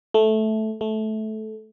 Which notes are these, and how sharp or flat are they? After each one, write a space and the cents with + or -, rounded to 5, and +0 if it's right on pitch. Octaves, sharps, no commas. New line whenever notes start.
A3 -10
A3 -15